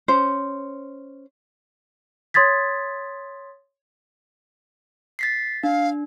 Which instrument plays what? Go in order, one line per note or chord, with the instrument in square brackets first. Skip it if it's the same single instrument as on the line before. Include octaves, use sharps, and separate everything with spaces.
[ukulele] C#4 C5
[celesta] C#5 C6 D#6 G#6 A6 B6
[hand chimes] A6 B6 C7
[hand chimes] D4 [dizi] F5